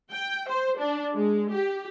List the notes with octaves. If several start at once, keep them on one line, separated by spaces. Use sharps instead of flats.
G5
C5
D4
G#3
G4